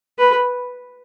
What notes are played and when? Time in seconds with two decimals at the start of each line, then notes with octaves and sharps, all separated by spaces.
0.18 B4